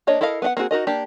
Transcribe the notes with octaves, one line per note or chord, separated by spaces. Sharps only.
A#3 D4 C#5 D#5
E4 A4 A#4 D#5 F5
B3 D4 F#5
A#3 C4 F#4 G#4
D#4 F#4 A#4 D#5
A#3 D4 G4